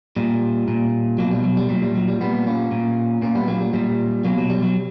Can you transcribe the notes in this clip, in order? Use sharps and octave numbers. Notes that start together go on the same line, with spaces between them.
A#2 G3
A#2
B2 F#3 A#3
G3
F#3
G3
A#2 F#3
G3
F#3
G3
A#2 G3 B3
A#3 C#4
A#2
A#2 A#3 C#4
G3 B3
F#3 A#3
G3
A#2 G3
B2 F#3 A#3
F#3
G3
F#3